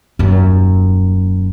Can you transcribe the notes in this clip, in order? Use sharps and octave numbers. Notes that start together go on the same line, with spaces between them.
D#1 F#2